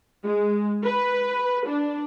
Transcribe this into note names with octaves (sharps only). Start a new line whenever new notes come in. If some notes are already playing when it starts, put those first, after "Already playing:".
G#3
B4
D4